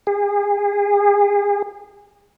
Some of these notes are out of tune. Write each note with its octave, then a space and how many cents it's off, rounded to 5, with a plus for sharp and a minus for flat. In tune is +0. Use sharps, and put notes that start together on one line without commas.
G#4 -35